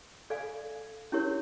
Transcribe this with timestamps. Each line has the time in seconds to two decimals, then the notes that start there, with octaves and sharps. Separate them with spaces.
0.30 A4 D5 F5 G#5
1.12 C#4 E4 G4 A#4 C#5